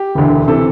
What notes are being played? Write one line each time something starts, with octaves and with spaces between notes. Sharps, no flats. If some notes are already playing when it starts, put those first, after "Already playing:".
Already playing: G4
E1 D2 D3
C3 E3 A4